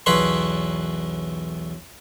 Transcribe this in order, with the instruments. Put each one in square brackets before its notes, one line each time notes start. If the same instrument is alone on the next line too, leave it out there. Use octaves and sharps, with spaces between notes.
[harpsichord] B1 E2 B4 C#5 B5 C6